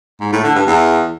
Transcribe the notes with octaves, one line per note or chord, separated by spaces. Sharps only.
G#2
A2
D3
G2
E2